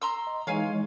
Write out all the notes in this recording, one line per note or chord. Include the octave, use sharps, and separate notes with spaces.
A#5 C6 E6
D#5
E3 G#3 D#4 C#5 F5 G#5